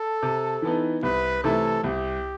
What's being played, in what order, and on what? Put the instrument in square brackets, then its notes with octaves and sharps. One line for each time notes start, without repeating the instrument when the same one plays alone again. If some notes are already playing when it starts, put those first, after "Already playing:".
Already playing: [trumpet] A4
[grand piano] C3
E3 B3 D#4
[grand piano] C2 [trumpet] B4
[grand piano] C3 E3 A3 E4 [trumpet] A4
[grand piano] C2 [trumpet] G4